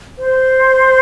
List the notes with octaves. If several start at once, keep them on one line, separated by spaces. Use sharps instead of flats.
C5